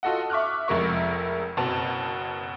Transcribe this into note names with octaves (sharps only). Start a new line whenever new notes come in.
F4 F#4 A4 D#5 F#5
E5 C#6 D6 F6 F#6
F1 F2 G#3 A#4 E5 C#6
F#1 B2 B3 C4 A5